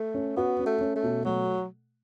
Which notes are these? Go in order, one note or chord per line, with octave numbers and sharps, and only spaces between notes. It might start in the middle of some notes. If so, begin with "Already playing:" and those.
Already playing: A3
C#4
B3 F#4
C#4
A3
C#4
A3
B2
F#3 A3